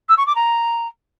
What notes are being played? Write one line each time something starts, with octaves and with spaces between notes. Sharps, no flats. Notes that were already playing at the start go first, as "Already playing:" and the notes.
E6
C#6
D6
A#5